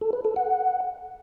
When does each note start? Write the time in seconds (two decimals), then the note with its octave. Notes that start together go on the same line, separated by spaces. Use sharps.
0.01 A4
0.13 B4
0.25 A4
0.36 F#5